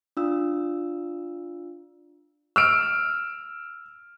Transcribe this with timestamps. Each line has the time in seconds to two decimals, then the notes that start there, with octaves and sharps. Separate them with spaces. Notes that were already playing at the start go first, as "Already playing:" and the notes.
0.17 D4 F4 E6
2.56 E6 F6 D7